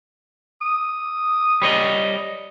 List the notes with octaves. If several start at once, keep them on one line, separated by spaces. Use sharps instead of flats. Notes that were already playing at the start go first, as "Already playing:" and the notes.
D#6
G3 C#5 D#5